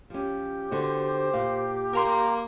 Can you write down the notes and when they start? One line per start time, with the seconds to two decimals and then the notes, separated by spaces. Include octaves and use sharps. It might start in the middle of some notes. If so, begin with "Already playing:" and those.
0.10 F3 C#4 G4
0.71 D3 B3 F#4 C5
1.33 A#2 F5
1.93 A#3 A#4 A#5 C6